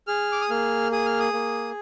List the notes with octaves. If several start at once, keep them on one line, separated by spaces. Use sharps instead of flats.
G#4 F6
D6
D#6
A#3 F6
G#4 D#6
F6
D#6
A#3